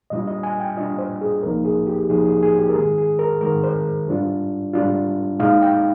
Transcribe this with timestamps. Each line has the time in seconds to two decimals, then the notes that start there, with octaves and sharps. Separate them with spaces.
0.10 A#2 G3 D4 F4 D#5
0.27 D#5
0.43 G#5
0.60 G5
0.77 A#2 G3 D4 F4 D#5
0.98 C5
1.21 G#4
1.43 C2 A#2 F3 A#3 D#4 A#4
1.65 G#4
1.87 G4
2.09 C2 A#2 F3 A#3 D#4 G#4
2.25 G#4
2.43 G#4
2.58 G4
2.70 A#4
2.75 G#2 D#3 G#3 G#4
2.98 G#4
3.19 A#4
3.41 G#2 D#3 G#3 A#4
3.63 C5
4.08 G#2 G3 D4 F4
4.73 G#2 G3 D4 F4
5.39 A#2 G#3 D#4 F5
5.62 G5